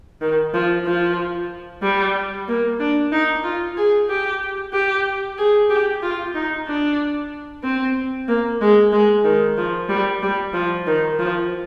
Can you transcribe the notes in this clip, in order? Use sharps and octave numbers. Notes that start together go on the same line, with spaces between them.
D#3
F3
F3
G3
A#3
D4
D#4
F4
G#4
G4
G4
G#4
G4
F4
D#4
D4
C4
A#3
G#3
G#3
D#3
F3
G3
G3
F3
D#3
F3